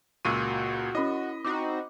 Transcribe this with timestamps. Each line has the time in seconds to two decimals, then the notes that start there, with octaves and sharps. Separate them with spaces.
0.25 C#2 A#2 F#4 C#6 E6 D#7
0.95 C#4 E4 D#5 B5
1.44 C4 D#4 F#4 D6